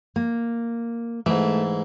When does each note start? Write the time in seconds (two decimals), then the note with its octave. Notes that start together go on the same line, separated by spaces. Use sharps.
0.16 A#3
1.26 G#2 E3 A3